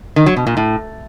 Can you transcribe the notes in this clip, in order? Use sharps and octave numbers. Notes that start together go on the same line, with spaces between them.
D#3
F#3
B2
A#2
A2